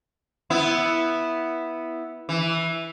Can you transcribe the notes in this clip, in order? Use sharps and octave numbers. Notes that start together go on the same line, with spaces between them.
B3 E4
E3